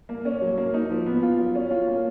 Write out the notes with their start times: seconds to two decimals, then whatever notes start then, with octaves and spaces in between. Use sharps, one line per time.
0.09 A#3
0.25 C#4
0.41 F#3
0.58 A#3
0.74 D#4
0.90 F3
1.06 B3
1.23 F4
1.39 F#3
1.55 C#4
1.71 F4
1.87 A#3